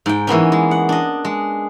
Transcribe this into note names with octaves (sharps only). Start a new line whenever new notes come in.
G#2 G5
E3 A#3 B3 C#4
G#3
F#5
D4 D#5
G#3